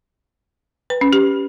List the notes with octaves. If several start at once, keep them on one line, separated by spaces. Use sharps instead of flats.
B4
C#4
G4